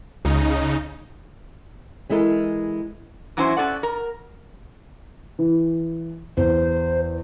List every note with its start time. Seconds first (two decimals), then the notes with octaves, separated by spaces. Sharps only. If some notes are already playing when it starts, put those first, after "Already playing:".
0.25 C#2 C#3 D#4
2.09 E3 G#3 E4 A4 A#4
3.37 E3 F#3 C#4 E4 A#4 C5
3.57 C#4 A4 D5 F#5
3.83 A#4
5.39 E3
6.37 E2 C5